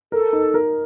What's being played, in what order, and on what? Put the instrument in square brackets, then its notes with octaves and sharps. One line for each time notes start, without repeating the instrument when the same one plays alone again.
[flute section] A4 [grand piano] A#4
[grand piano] D#4
A#4